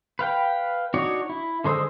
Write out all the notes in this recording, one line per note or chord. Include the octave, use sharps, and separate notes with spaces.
B4 F5 G5
D4 D#4 F#4 C#5
E4
D3 G#3 C5 D#6 E6